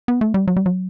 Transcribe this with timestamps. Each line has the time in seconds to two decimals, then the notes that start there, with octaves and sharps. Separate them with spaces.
0.08 B3
0.21 A3
0.34 G3
0.48 F#3
0.56 G3
0.66 F#3